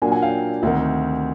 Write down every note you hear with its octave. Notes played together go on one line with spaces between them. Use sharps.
A#2 F#3 A#3 D4 F#5 G#5
F#5 G#5
F5 G5
D2 C3 D#3 E5 F#5